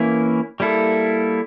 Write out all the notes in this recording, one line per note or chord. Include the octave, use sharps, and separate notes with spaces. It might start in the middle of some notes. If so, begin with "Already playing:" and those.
Already playing: E3 A#3 C#4 E4
G3 A#3 E4 A4